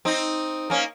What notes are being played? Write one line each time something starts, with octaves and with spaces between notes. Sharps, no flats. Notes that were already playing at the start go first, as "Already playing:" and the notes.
C4 D#4
A#3 C#4